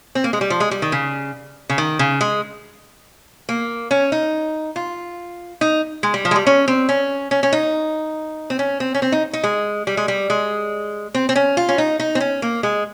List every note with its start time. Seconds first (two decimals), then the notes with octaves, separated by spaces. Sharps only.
0.15 C4
0.24 A#3
0.33 G#3
0.41 G3
0.50 F3
0.60 G#3
0.71 G3
0.82 D#3
0.92 C#3
1.69 C#3
1.78 D#3
1.99 C#3
2.21 G#3
3.49 A#3
3.91 C#4
4.12 D#4
4.76 F4
5.61 D#4
6.03 G#3
6.14 G3
6.25 F3
6.31 G#3
6.36 G3
6.46 C#4
6.68 C4
6.89 C#4
7.31 C#4
7.43 C#4
7.53 D#4
8.50 C4
8.59 C#4
8.80 C4
8.94 C#4
9.02 C4
9.12 D#4
9.33 D#4
9.43 G#3
9.87 G3
9.97 G#3
10.08 G3
10.30 G#3
11.14 C4
11.29 C4
11.36 C#4
11.57 F4
11.69 C#4
11.78 D#4
12.00 D#4
12.15 C4
12.20 C#4
12.42 A#3
12.63 G#3